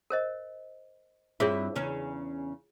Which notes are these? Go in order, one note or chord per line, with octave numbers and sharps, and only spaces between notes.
A#4 C5 D#5
G2 C4 E4 F4 G#4 C#5
E2 C#3 C#4